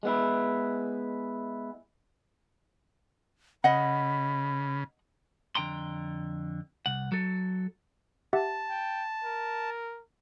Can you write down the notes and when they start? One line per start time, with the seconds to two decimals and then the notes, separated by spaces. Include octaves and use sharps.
0.03 G#3 B3 E4
3.64 C#3 D#5 F#5 B5
5.55 F2 D3 G5 A#5 C6
6.86 C2 F#5
7.12 F#3 A4
8.33 G4 E5 F#5 A5
8.69 G5
9.24 A#4